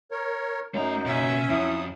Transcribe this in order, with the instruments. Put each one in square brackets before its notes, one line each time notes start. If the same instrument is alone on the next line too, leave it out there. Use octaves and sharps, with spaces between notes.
[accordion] A#4 C#5
[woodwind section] F#2 [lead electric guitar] A3 A#5 [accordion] D#4
[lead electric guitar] B2 A#3 [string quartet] C#4 E5
[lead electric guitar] F2 [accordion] F#3 D#6 [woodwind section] E4